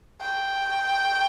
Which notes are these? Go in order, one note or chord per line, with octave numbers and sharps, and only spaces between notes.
G5